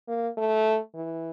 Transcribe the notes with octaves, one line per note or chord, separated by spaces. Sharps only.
A#3
A3
E3